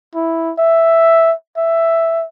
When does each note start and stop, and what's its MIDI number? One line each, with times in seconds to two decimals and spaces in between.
0.15 0.52 64
0.58 1.33 76
1.57 2.25 76